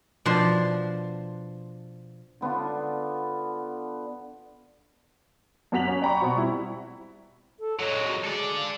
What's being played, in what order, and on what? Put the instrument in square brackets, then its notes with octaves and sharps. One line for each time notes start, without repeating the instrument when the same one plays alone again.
[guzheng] B2 F3 D4 C5 C6
[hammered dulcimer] D3 B3 D4 F4
[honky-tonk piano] F#2 A#3 F#4 B6 F7 F#7
C#4
D5 G5 A#5 B5 C#6
B2 C4 F#4 C#6
G3 E4
[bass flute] A4
[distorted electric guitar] F#3 G#3 [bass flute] C#5
[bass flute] F#4
[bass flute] G#3 [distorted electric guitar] A4 D5
[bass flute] F5